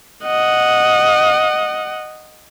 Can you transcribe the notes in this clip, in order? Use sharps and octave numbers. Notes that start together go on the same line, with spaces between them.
D#5 F#5